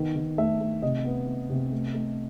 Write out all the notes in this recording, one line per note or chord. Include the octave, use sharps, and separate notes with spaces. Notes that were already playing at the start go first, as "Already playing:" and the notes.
Already playing: D#3 B3
D#3
A3 E5
A3
C3 D#5
B3
B3
C3
A3
A3